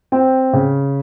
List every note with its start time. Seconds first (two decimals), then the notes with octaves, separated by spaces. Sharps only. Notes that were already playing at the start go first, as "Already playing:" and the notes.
0.12 C4 G5
0.53 C#3